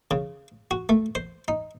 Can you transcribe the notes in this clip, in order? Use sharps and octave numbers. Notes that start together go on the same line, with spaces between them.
C#3
F#4
A3
C5
D#4